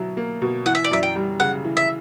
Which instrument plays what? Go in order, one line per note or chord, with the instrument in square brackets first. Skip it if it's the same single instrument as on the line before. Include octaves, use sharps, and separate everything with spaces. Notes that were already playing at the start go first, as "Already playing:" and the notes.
Already playing: [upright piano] B2 F#3 E4
A#3
B2
[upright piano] E3 [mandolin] F#5
[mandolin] E5
D5
[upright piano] F#2 [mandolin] E5
[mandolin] G5
[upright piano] G3
[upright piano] C#3 [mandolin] F#5
[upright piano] E3
[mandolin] E5